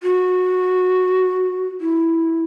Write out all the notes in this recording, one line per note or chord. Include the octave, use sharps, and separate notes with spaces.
F#4
E4